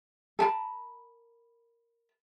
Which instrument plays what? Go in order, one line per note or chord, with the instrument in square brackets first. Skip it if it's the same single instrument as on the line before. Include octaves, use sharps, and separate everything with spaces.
[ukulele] A4 A#4 A5 B5